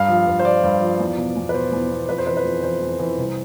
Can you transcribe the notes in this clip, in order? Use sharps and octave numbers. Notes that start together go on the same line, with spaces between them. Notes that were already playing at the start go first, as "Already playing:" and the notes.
Already playing: G2 F5
F3
G2
C5
F3 D5
G2
F3
E2
B2
E2
B4
B2 C5
E2
B2
F2 B4
C5
E3 B4
B4
F2
E3 C5
F2
E3
C2